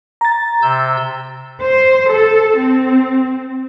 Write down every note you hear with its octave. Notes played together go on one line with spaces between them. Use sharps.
A#5 A6
C3 E6 G6
C5
A4
C4